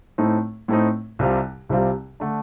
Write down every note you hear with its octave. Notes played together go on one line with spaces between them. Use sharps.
A2 A3 C4 D#4
A2 A3 C4 D#4
C2 C3 G3 C4 F4
C2 C3 G3 C4 F4
D3 A3 D4